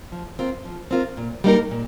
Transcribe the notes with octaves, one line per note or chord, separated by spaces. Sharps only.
F3
C4 F4 A#4
F3
C4 F4 A#4
A#2
G3 A#3 D#4 A#4
A#2